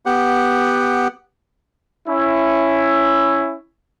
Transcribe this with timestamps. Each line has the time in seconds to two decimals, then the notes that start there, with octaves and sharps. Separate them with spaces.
0.06 B3 G4 F#5
2.08 C#4 E4